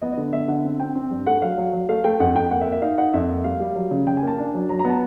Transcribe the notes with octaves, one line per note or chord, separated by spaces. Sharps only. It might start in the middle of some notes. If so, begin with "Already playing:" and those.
B3 D#5
D#5
D3
B3 E5
D3 F#5
C4
C4 G5
C4
G2
A3 F#5
F#3 F5
F#3
F#3
A3 F5
A3 G5
F2 F#5
F2 G5
A#3 F#5
E5
A#3
E5
D#4 F5
D#4 F#5
F2 E5
A#3 E5
G3 F5
G3
F#3
C#3
C#3 G5
G#5
A#3 A5
D4
F#3
F#3 A#5
A#5
B3 A5